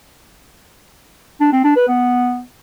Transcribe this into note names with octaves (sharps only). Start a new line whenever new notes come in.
D4
C4
D4
B4
B3